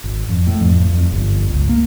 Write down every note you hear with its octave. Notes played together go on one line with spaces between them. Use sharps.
G#1
F2
A2
F2
F2
G1
C#2
A#3